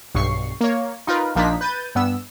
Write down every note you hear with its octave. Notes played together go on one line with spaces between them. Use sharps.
B1 G2 C#6 C7
A#3 C#5
D#4 F4 A#4 B4
A#1 F3 A#3 D4 D#4 B6
B4 G6 A6 D#7
G2 B3 E6